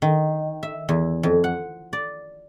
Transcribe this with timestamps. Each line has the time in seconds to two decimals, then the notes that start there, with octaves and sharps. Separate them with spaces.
0.02 D#3
0.63 E5
0.89 E2
1.23 F2
1.44 F#5
1.93 D5